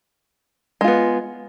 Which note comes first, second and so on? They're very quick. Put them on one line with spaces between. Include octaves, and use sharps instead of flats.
G#3 F4 B3